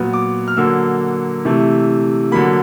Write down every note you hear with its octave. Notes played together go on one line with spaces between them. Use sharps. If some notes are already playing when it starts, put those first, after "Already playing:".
Already playing: A#2 F#3 B3
D6
F6
D3 F#3 A#3 E6
C3 E3 A3
D3 F#3 A#3 B5